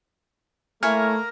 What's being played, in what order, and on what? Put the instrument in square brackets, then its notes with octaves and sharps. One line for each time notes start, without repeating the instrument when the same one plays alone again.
[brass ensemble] A3 [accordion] A#3 A#4 A#5 [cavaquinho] E4 C#5 G#5 [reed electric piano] F6